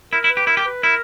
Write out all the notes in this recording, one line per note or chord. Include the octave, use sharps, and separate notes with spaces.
E4 A#4
E4
B4
G4
E4 A#4
G4
B4
E4 A#4